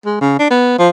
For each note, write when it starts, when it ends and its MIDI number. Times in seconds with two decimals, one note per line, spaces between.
0.05 0.16 56
0.21 0.35 49
0.39 0.49 62
0.50 0.77 59
0.79 0.89 53